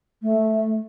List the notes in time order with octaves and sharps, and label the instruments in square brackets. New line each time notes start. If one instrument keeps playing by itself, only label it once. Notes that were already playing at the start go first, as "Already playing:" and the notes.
[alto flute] A3